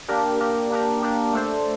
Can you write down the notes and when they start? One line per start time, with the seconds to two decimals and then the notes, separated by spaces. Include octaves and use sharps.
0.08 A#3 D4 G4 A#4
0.40 A#3 D4 G4 A#4
0.71 A#3 D4 G4 A#4
1.02 A#3 D4 G4 A#4
1.33 A3 D4 A4 C5